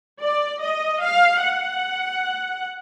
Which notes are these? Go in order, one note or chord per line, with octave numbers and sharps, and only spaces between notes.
D5
D#5
F5
F#5